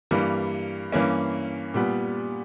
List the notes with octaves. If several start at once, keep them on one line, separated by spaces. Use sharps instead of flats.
G2 E3 G3 A#3
G2 E3 A#3 C#4
A#2 G3 B3